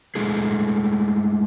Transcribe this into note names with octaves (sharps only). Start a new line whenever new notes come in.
G#3 A3 E4 G#4